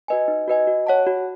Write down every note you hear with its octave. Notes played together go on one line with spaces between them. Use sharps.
F#4 B4 D#5 G#5
D#4
F#4 B4 D#5 G#5
F#4
C#5 F#5 A5
F#4